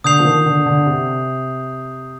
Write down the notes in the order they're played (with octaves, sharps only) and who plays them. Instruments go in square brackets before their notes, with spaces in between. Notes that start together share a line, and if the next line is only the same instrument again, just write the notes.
[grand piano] D3 [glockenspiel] D#6 G6 C7 F7
[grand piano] F3
D#3
D3
D3
C3